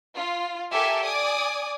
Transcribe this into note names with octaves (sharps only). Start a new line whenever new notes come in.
F4
G4 A4 A#4 E5 G#5 A5
D5 G#5 D6 D#6